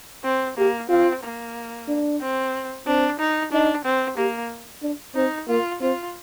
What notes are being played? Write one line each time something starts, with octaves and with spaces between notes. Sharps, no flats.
C4
A#3 G4
C4 F4
A#3
D4
C4
C4 D4
D#4
D4 D#4
C4
A#3 G4
D4
C4 D#4
A#3 F4
C4 F4